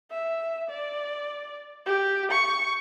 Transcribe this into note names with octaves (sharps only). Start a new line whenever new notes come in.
E5
D5
G4
C#6